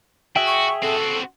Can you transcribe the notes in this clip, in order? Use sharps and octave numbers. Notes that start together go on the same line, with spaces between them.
F#4 G#4 E5 G5
C#6
C4 F#4 A4